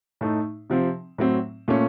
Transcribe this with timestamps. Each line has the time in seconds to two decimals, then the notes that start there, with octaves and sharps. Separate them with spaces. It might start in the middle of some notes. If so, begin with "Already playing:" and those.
0.21 A2 A3 D#4
0.70 C3 F3 C4
1.18 A2 F#3 C4
1.68 A#2 A3 C#4